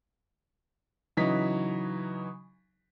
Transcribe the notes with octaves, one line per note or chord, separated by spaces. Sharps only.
C#3 E3 F#3 D#4 B6